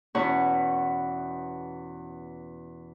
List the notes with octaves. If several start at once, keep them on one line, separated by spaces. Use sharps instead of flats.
E2 B2 C#4 E4 C#5 F#5